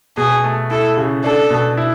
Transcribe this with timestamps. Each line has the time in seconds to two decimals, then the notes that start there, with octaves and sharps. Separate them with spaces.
0.17 B2 G#4
0.44 A3
0.70 E4 A4
0.97 C#3
1.24 D4 A4
1.50 B2
1.77 E4